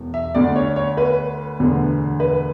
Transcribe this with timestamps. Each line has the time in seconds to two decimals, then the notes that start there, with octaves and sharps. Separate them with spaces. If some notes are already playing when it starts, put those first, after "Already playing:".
Already playing: E1 E2
0.14 E5
0.34 D2 D3 D5
0.56 C#5
0.76 C#5
0.97 B4
1.59 E1 D2 D3
2.20 B4